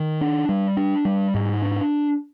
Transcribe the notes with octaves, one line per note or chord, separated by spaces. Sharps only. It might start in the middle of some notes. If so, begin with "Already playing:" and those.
Already playing: D#3
D4
G3
D4
G3
G#2
D4